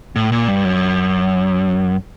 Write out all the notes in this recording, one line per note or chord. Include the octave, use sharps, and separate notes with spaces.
A2
A#2
G2
F#2